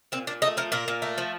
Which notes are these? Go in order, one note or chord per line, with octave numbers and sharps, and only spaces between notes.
A#2 C4
A#2 D4
A3 D#4
F3 A#4
A#2 A#4
A#2
A3
F3